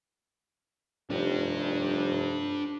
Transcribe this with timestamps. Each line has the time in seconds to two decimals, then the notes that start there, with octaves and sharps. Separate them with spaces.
1.10 F1 D4 G4